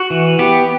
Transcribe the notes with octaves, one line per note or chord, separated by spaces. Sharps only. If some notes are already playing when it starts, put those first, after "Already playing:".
Already playing: F#4
E3
B3 G4